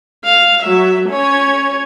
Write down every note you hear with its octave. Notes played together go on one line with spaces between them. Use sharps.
F5
F#3 E5
C#4 C#5